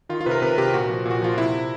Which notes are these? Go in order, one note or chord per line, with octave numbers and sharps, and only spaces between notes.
D#3 F4
F4
C3 A#4 B4
C3 B4
C3 G4
A#2 F#4
F3
A#2
F#4
F3 F4
C3 E4
C3